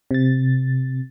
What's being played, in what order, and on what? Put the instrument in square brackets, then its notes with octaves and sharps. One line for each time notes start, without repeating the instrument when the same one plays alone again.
[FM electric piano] C3 A6